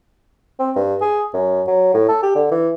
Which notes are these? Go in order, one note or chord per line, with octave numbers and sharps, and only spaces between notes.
C4
G2
G#4
F#2
F#3
A2
A4
G4
D3
E3